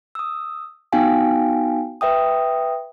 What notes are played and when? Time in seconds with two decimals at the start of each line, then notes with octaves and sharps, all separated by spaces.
0.15 D#6 E6
0.92 B3 D#4 F#4 F5 G5 G#5
2.01 B4 E5 G5 D#6